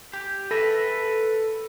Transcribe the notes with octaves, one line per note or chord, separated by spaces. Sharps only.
G4
A4 B4 E5 A#6